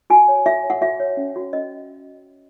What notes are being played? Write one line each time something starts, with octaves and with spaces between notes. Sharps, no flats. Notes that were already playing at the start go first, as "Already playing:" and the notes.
F#4 G#5
C#5
F#4 E5
C#5
F#5
F#4 E5
C#5
C#4
F#4 C#5
C#4 D#5